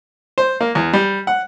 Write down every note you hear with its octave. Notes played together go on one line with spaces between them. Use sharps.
C5
A#3
E2
G3
F#5